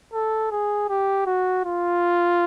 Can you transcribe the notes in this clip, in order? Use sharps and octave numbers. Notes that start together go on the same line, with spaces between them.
A4
G#4
G4
F#4
F4